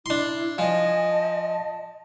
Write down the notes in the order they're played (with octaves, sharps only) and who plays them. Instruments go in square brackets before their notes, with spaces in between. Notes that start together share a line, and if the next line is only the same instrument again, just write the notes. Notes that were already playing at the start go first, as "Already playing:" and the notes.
[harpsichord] D4 C6 [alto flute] E4
[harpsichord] F3 [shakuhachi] D#5 [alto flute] G#5
[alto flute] A5